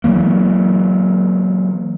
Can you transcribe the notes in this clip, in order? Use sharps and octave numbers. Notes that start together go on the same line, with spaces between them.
E3 F#3 A#3